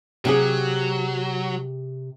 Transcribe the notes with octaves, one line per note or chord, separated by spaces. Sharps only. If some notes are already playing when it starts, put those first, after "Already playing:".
C3 F#3 G4 G#4